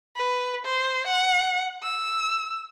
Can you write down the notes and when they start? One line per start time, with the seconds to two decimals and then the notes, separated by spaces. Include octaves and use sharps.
0.16 B4
0.65 C5
1.07 F#5
1.83 E6